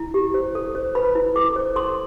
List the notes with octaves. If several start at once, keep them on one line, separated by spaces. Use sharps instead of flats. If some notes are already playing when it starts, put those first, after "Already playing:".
Already playing: E4
G4
C5
A4
C5
B4 B5
E4
A4 D6
C5
A4 C6